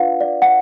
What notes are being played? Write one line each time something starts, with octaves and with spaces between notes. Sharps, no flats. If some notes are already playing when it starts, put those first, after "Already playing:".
Already playing: D4 F4 B4 D5 F5 F#5
D5
F#5